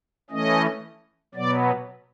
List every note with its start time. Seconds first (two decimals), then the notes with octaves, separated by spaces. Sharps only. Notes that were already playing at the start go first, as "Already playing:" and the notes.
0.30 E3 A3 C#4 D#5
1.35 B2 F#3 B3 D5